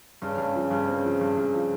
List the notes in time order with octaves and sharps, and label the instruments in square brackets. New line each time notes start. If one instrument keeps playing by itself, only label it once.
[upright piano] G2 [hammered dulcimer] C#3
[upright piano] G2
F3
[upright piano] G2 [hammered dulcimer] C#3
[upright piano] C4
F3
G2
G2
F3